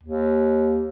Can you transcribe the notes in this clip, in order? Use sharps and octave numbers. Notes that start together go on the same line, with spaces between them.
D#2